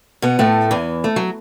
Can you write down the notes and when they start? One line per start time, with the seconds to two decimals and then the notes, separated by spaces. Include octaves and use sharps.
0.22 B2 B3
0.39 A2 A3
0.71 E2 E3
1.04 A3
1.16 F#3